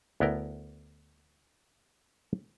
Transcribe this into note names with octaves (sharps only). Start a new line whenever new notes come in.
D2 B3 E4 A#4 G5